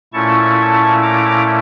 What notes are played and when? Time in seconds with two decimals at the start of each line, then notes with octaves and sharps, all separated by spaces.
0.13 A#2 A3 C#4 E4 A5 C#6
1.03 A#5 D6